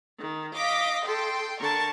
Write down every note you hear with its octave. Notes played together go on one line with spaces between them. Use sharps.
D#3
D#5 F5 D6 B6
A4 G5 C6
D3 A#4 A5 C#6